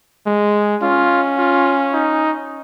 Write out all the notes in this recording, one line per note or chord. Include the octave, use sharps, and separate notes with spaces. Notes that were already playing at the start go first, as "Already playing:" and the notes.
G#3
C#4 F4
F4
D#4